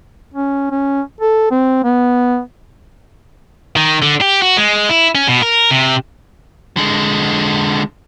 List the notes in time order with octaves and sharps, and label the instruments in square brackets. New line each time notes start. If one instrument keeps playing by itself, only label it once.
[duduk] C#4
C#4
A4
C4
B3
[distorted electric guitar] D#3
D3
G4
F#4
G#3
E4
C#4
B2
A#4
C3
[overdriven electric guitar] D3 G#3